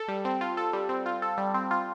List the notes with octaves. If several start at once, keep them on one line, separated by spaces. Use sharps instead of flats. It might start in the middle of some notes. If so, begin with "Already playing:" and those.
Already playing: A4
G3
C4
F4
A4
G3
C4
F4
A4
G3
C4
F4